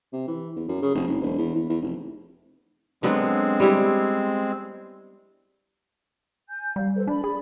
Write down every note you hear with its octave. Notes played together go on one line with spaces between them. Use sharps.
C3
E3
E2
F#2
C#3
F1
F#1
E1
E2
E2
E2
F1
D3 F#3 G#3 B3 C4
G3 E4
G#5 G6
G3 F5
A4 B4 C5
D4 D5 B5
G#4